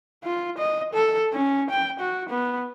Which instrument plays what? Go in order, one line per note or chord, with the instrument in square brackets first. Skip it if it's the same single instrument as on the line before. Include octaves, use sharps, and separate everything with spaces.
[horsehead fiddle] F4
D#5
A4
C#4
G5
F#4
B3